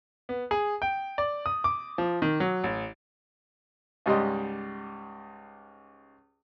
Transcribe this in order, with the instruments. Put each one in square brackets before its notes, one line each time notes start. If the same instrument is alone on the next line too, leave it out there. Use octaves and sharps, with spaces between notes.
[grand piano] B3
G#4
G5
D5
D#6
D6
F3
D#3
F#3
A1
[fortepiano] C#2 G#2 G3 G4 D#5 C6